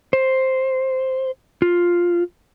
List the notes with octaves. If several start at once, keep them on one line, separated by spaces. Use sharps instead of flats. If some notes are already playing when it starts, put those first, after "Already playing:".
C5
F4